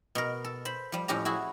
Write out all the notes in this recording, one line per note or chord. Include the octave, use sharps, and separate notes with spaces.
B2 A#4
A4
C5 B5
F3 G3
F2 A2 C#4 G4 A#5
E4 F#4 G#4